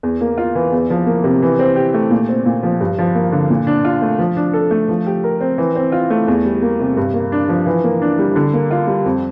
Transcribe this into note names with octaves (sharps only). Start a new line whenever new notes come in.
E2
A#3
F4
E3
E2
F3
A#3
C3
E3
C4
G4
A3
A#2
C4
A#2
F3
G2
F3
A#3
D3
A#2
D4
F4
A3
F3
D4
A4
A3
F3
G4
A#4
C4
E3
C4
F4
A3
E2
G3
A#3
C3
G2
A#3
D4
F3
E3
A#3
D4
G3
D3
A#3
F4
G3
F2